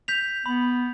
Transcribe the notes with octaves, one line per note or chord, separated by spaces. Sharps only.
G6 B6 F7
B3 B5